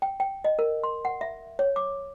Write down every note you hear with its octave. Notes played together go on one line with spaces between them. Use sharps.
G5
G5
D#5
A#4
C6
F#5
E5
C#5
D6